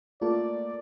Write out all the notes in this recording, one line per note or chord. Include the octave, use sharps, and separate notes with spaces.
A3 A#3 F4 D5